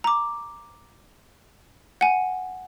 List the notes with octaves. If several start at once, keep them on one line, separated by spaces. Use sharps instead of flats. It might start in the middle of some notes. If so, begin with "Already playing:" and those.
A#5 D6
F#5 G#5